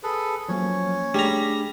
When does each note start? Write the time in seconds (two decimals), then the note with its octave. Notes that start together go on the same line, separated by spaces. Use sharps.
0.03 G#4 A4 B4
0.49 F3 F#3 A#3 C#4 C#5
1.15 G3 A3 D4 G#4 A#5